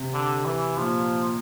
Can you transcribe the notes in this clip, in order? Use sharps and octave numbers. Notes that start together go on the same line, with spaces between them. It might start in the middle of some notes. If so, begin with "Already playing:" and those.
Already playing: C3
D3
E3
A#2 F3